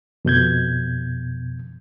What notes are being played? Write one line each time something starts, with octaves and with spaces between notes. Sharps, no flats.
F2 B2 G6 G#6